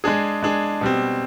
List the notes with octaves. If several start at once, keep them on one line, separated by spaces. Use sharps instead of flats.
G#3 D4 G#4
G#3 D4 G#4
B2 G3 C4